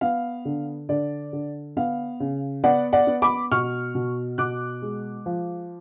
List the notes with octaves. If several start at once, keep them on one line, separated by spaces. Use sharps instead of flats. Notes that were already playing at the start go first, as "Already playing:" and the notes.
B3 F5
D3
D3 D5
D3
B3 F5
C#3
B3 D5 F#5
D5 F#5
B3
B5 D6
B2 C#6 F6
B2
B2 D6 F#6
G#3
F3